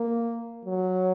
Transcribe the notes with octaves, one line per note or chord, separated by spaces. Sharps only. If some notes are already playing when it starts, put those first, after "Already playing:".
Already playing: A#3
F#3